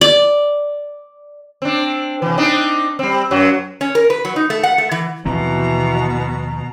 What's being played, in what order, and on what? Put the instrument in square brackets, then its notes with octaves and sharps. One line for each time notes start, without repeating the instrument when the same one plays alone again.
[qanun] D5
[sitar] C4 D4
C3 E3
C4 D4 D#4
G3 C4
F#2 F#3
[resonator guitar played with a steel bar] C#4
A#4
B4
F#3
D#4
A3
F#5
A3
E3
[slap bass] D#2 F3 C4 [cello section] B2 [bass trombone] E3 [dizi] A#5